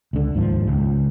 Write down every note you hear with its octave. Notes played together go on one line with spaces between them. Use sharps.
C#2 D3
D#2 G#2 F3
C#2